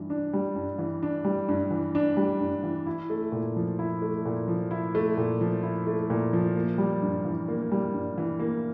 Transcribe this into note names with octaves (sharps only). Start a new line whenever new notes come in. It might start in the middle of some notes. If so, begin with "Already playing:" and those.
Already playing: G2 E3
D4
G3
G2
E3
D4
G3
G2
E3
D4
G3
G2
E3
E4
A3
A#2
F3
E4
A3
A#2
F3
E4
A3
A#2
F3
E4
A3
A#2
F3
A#3
G3
G2
E3
A#3
G3
G2
E3
A#3